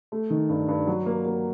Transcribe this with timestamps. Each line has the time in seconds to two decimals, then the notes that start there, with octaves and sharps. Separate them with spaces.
0.12 A3
0.30 D#3
0.49 G2
0.68 G2
0.87 F#3
1.06 A#3
1.25 A#3